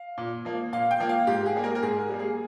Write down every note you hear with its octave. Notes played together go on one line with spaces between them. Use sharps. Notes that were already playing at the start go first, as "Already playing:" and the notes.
Already playing: F5
A#2
F3 A#3
A#2 F5
G5
F3 A#3
F5
G#2 G4
G#4
G3 A#3
A#4
A#4
G#2 G#4
G3 A#3
G#4